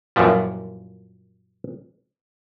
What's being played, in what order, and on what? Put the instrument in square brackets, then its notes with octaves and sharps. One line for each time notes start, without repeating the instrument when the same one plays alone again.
[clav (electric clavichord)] F#2 A#2 E3 F3 G3